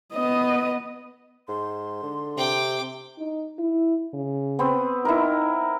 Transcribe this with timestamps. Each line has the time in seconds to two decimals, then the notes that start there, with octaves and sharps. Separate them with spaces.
0.14 B3 D#5
1.48 G#2 C6
2.03 D3
2.38 C3 G5 D6
3.18 D#4
3.59 E4
4.14 C#3
4.59 B3 C4
5.05 D#4 E4 A#4